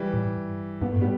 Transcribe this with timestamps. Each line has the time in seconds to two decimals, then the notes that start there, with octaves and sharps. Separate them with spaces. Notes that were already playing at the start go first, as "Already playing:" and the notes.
Already playing: E3 G3
0.14 A2
0.37 G2
0.82 G2 B3
0.91 A3
0.97 A2 G3 B3